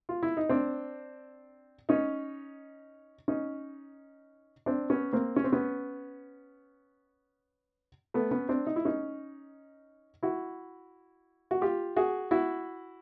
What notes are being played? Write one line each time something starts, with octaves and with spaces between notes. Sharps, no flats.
F4
E4
D#4
C4 D4
C#4 D#4
C#4 D#4
C4 D4
B3 C#4
A#3 C4
C#4
C4
B3 C#4
A3 B3
B3 C#4
C4 D4
D#4
E4
C#4 D#4
E4 F#4
F#4
F4 G4
F#4 G#4
E4 F#4